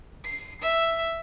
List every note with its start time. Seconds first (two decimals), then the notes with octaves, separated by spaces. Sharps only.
0.25 C7
0.61 E5